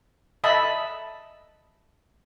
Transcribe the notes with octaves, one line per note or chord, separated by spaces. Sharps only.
D#5 E5 A5 B5